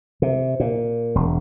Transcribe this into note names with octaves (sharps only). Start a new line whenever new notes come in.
C3
A#2
E1